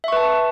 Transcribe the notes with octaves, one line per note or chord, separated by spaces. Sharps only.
B4 E5 A5 C#6